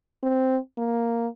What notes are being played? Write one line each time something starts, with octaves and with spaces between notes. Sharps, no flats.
C4
A#3